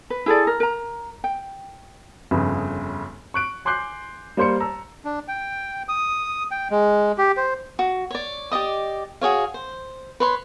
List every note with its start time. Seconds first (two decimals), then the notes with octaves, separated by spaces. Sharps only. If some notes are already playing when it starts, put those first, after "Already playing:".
0.10 B4
0.26 E4 G#4 A4 D5
0.47 A#4
0.60 A#4 A#5
1.24 G5
2.31 G1 F2 C#3
3.34 C#6 F#6 D7
3.65 G#5 C6 D6 F#6 G6 C7
4.37 G3 A#3 C5 C6 C#7
4.60 A5 A#5 E6
5.05 D4
5.28 G5
5.89 D#6
6.51 G5
6.71 G#3
7.18 G4
7.37 C5
7.79 F#4
8.11 C#5 D5
8.52 G4 D5 D#5 D#6
9.21 F#4 G#4 C#5 F5
9.54 C5
10.20 B4 C#5 C6